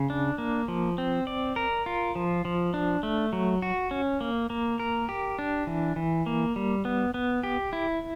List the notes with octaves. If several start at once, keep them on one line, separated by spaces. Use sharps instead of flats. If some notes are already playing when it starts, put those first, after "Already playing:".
Already playing: C#3
D4
A#3
F3
C4
D5
A#4
F4
F3
F3
D4
A3
F#3
F#4
C#4
A#3
A#3
A#4
G4
D4
E3
E3
A#3
G3
B3
B3
G4
E4